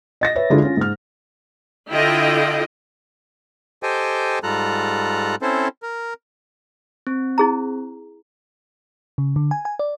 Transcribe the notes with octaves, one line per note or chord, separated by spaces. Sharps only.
D#5 A6 A#6
B4 C#5 E5
D3 G#3 D4 E4 F4 A4
C#4 F4
G#2 F6
D3 E4 F4 D#5 G5
G4 A4 C5 D#5 G5 G#5
G#2 G3 F4 A4 A#5 F#6
C4 C#4 E4 A4 C5
A#4
C4
E4 G#4 A#5
C#3
D3
G#5
G#5
D5